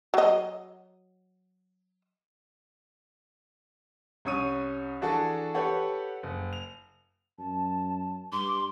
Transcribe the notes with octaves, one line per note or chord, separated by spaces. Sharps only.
F#3 D#5
C2 C#4 C#5 D#6 D#7
E3 D4 F#4 G#4 A4
G4 A4 B4 C#5 F#5
F#1
F7
F#2 A5
G2 C6 D6